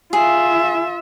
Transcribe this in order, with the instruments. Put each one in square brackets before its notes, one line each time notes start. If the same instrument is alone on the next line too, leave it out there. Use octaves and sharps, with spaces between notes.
[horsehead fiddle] F4 E5 [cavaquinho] G#4